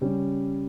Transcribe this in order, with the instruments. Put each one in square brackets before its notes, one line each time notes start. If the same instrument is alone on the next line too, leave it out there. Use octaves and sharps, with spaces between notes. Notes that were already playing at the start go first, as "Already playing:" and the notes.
[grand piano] C#3 G3 C#4